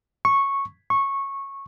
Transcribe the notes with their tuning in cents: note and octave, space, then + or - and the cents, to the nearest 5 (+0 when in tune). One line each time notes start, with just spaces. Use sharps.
C#6 -10
C#6 -15